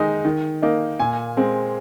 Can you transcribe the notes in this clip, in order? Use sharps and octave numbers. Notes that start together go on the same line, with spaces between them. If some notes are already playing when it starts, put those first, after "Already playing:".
Already playing: D#3 G#3 D#4
D#3
A#3 D#4
A#2 G#5
G#3 C4